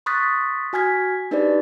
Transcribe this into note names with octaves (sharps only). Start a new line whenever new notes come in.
C6 C#6 D#6 F#6 A6 B6
F#4 G#5 F6 G#6 B6
D4 D#4 G4 B4 C5 D5